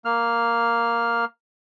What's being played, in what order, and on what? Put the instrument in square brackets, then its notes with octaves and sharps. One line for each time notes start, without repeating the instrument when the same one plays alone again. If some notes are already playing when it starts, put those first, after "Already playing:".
[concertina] A#3 F6